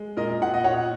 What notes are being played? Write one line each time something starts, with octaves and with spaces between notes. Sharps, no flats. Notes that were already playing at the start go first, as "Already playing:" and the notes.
Already playing: G#3
A#2 A#4 D#5
A#2 F#5
D#5
A#2 C#5 F#5